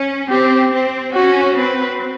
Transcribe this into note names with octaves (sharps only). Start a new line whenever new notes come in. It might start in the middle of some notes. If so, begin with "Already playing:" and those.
Already playing: C#4
C4 G4
C4
C#4 F#4
C4 B4